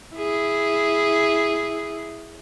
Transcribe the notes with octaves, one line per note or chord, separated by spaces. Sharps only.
E4 G#4